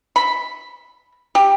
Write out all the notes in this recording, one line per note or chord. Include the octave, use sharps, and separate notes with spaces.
B5
G4